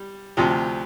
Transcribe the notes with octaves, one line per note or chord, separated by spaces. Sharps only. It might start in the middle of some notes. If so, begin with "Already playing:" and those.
Already playing: G3
D2 C3 F3